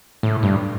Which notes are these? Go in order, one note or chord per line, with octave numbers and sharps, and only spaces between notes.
A2
G2